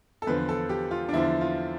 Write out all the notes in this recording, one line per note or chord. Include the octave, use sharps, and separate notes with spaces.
A4
E2 D3 F3 B4
A4
G4
F4
D4
E2 D3 F3 E4
F4